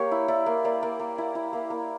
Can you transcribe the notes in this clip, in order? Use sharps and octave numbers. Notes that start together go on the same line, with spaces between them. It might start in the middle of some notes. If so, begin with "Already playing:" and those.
Already playing: A#3 G4 C#5
E4
E4 D5
A#3
A#3 D5
A#3
A#3
E4
E4
A#3
A#3